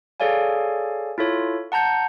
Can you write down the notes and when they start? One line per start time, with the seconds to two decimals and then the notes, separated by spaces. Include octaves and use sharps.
0.20 G#4 A4 C#5 D5 F5 G#5
1.18 E4 F4 A4 C#5
1.72 F#5 A5 A#5 G6 C#7